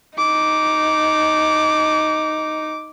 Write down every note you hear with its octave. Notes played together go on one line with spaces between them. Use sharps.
D#4 D6